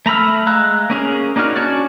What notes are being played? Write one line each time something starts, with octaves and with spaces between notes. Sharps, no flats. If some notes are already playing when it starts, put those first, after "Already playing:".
A3 A#5 B5 E6 F6
G#3 F5 A#5 E6 F#6
A#3 C#4 G#4 A#4
A#3 D4 D#4 F#4 F6
C#4 D4 F#4 C#5 D5